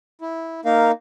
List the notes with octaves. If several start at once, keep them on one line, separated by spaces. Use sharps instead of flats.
E4
A#3 D#4 A#4 F5